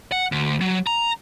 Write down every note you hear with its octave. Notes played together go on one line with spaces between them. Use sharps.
F#5
D2
F#3
A#5